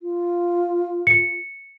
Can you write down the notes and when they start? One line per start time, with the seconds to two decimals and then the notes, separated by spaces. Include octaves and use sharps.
0.02 F4
1.07 C#7